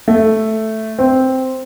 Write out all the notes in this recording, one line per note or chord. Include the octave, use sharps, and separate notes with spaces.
A3
C4